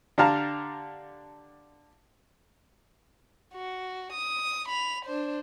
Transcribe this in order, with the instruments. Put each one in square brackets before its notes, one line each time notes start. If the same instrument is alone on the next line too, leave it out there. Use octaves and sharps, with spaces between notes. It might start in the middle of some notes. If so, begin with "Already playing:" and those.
[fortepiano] D3 D4 G4 F5 A5 A#5
[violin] F#4
D#6
B5 F7
D4 C5